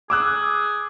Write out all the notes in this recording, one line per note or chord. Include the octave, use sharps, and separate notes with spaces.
G#4 D6 E6 F#6